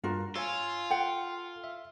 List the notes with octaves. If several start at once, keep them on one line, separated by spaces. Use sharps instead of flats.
G2 F4 F#4 A#4
F4 C#5 G#5 E6
A4 F#5 G5
E5